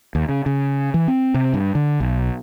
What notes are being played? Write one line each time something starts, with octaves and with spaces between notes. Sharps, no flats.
D#2
C#3
C#3
E3
C4
C3
G2
D3
B1